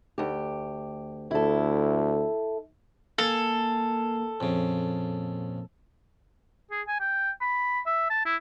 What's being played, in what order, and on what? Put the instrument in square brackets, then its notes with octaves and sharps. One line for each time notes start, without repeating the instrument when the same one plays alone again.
[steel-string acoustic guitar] D2 G4
[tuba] D2 [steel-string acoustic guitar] E4 A4
[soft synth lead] A#3 [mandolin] A4 [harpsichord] F5 G#5
[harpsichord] F2 C#3 [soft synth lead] A#2
[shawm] G#4
G#5
G5
B5
E5
A5
E4